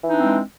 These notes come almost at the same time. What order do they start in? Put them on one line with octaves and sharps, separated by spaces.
E3 D#4 D4 C4 G#3